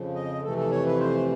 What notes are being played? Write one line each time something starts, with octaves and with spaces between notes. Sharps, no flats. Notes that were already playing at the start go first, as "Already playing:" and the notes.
Already playing: F2 C#3 F3
D#5
F2 C3 E3 A3 A4
A4
C#5
B4
C5